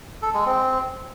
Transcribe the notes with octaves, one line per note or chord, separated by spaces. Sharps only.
A4
G#3
C4